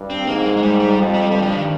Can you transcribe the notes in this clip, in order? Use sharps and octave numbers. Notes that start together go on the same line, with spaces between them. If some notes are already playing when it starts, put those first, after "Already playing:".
Already playing: G2
C4
G#2 A#3
G#3
G#3
G#2 G3
G3
F2
G3
G2 G3
F3
D#3